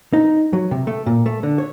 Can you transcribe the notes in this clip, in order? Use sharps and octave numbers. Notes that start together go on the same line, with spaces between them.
D#4
F#3
C3
A3
A#2
A3
D3
C#5